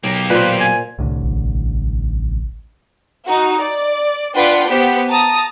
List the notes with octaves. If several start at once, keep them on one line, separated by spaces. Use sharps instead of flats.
B1 A#3 G4
A#2 B4 C5
G#5
C2 A2 D3
A1
D#4 F#4
D5
D4 F4 B4 F#5 G5
B3 G4 C5
A5 A#5 D#6